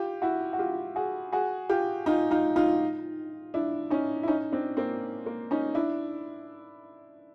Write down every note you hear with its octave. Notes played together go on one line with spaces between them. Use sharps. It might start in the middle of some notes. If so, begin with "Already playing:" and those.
Already playing: F4 G4
E4 F#4
F#4
F4 G4
F#4 G#4
F#4 G#4
F4 G4
D#4 F4
D#4 F4
D#4 F4
D4 E4
C#4 D#4
E4
C#4 D#4
C4 D4
A#3 C4
A#3
C#4 D#4
D4 E4